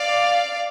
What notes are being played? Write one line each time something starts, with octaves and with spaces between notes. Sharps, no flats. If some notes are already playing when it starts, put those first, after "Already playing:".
Already playing: D5 F5